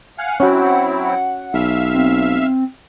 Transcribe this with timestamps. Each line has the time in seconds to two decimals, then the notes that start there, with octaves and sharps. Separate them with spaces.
0.18 F5 F#5 G#5
0.40 F#3 C4 C#4 E4 F#4 F#5
1.54 B1 E5 F5
1.94 C4